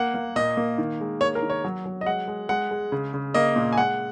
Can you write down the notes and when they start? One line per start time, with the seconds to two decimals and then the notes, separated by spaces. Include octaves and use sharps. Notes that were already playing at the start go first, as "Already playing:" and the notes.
Already playing: A#3 F#5
0.14 A#3
0.36 A#2 D#5
0.57 A#3
0.78 D#3
1.00 G#3
1.21 A#3 C#5
1.35 A#4
1.42 D#3
1.50 C#5
1.65 F#3
1.85 F#3
2.01 D#5
2.06 G#3 F#5
2.28 G#3
2.49 G#3 F#5
2.71 G#3
2.92 C#3
3.14 C#3
3.34 A#3 D#5
3.56 A#2
3.73 G#5
3.77 G#3 F#5